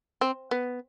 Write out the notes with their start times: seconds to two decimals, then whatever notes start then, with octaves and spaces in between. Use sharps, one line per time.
0.21 C4
0.51 B3